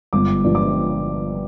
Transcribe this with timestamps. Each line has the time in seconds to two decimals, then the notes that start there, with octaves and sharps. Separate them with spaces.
0.13 G1 D6
0.44 G2 F3
0.55 D6